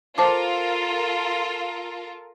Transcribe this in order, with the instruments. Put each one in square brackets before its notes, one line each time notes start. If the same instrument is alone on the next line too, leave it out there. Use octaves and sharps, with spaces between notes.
[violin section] F4 A4 A#4 [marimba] C5 A5 D6